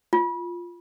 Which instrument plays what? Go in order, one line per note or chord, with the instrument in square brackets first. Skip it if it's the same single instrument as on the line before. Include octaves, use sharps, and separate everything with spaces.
[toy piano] F4